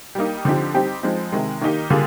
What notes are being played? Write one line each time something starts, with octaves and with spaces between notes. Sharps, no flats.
G3 A#3 D#4
D3 F3 C4 D#4 G4
G3 C4 D#4 G4
F3 G#3 C4 D#4
C3 D#3 G#3
D#3 A#3 D#4 G4
D3 G3 A#3 F4 G#4